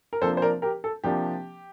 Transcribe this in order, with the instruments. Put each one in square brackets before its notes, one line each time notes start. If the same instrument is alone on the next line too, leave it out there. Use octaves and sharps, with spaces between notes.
[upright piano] A#4
C3 F3 A#3 D4 A4 C5
C5
A#4 D5
G4 A#4
A4
C3 F3 A#3 D4 G4